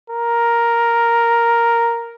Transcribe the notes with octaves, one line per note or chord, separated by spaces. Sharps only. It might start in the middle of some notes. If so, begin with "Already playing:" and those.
A#4